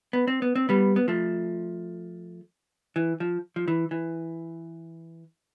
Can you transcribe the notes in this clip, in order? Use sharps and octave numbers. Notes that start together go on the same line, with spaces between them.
B3
C4
B3
C4
G3 B3
B3
F3 A3
E3
F3
F3
E3
E3